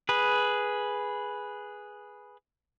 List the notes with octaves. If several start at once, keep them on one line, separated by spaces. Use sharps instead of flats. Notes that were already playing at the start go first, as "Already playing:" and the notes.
G#4 B4